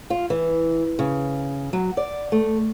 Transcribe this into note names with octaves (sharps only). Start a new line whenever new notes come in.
F4
E3
C#3
F#3
D5
A3